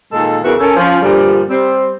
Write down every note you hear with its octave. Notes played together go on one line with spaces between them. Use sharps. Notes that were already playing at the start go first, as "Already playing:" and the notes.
A#2 D#3 G#3 A4
E2 C#3 E3 F#4 A#4 E5
C#4 A4 A#4
F3 C#4
G2 A#2 D3 F3 G3
G3 C4